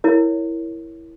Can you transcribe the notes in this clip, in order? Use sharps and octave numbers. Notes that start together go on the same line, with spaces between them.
E4 A#4 C#5